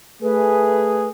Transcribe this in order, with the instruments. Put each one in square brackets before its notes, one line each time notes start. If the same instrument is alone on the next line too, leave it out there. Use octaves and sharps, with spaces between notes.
[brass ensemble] A3 G#4 [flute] B4